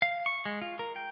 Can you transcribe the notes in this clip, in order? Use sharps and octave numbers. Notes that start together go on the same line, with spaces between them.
F5
C#6
G#3
F4
A#4
G5